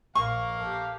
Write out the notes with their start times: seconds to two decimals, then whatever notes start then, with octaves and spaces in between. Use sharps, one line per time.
0.15 A#1 A#3 A#4 F5 C#6
0.60 G4 A4